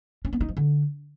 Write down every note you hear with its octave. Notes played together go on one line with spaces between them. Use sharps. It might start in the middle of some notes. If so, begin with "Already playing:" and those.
C#4
B3
D#4
F3
D3